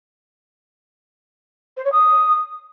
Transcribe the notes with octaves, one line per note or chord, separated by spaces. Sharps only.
C5
C#5
D#6